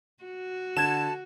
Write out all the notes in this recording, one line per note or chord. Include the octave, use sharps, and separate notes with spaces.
F#4
D3 A5 G#6 E7